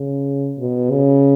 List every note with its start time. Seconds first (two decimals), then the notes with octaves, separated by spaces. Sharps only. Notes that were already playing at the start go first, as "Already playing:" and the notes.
Already playing: C#3
0.58 B2
0.91 C#3